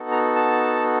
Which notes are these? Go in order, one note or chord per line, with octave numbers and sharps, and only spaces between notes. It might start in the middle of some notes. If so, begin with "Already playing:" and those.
Already playing: B3 D#4 F#4 A4
A#5
A5